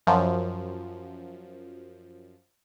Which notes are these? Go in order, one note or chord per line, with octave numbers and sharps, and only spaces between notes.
F#2 F3